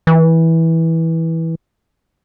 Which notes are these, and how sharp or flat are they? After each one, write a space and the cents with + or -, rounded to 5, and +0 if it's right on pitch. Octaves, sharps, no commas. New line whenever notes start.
E3 -15